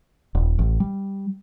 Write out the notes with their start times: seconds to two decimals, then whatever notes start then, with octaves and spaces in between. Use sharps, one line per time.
0.35 D#1
0.59 A1
0.80 G3